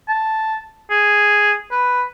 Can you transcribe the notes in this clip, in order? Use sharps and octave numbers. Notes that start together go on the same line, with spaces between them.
A5
G#4
B4